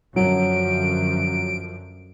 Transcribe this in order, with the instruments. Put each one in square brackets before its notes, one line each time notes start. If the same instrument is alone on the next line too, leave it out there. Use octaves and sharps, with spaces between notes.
[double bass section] F#2 D3 F3 [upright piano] F#3 [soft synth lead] D7